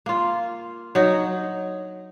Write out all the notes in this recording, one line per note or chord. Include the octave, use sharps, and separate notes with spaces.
A#3 F4
F#3 D#4